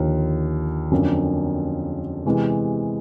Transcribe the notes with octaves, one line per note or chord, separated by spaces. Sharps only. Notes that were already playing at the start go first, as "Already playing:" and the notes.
Already playing: D#2 D3 F3
F2 D3 F#3 A#3 C#4
C3 E3 G#3 B3